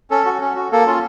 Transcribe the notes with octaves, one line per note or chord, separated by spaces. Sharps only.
C#4 A4
F#4
C#4
F#4
A#3 A4
C#4 F4